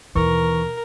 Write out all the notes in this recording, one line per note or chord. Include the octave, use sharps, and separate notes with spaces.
D#2 B2 E3 A#4 C#6